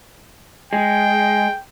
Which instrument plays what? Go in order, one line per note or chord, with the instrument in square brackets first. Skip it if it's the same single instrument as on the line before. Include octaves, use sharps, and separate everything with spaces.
[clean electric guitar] G#3 [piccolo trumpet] G5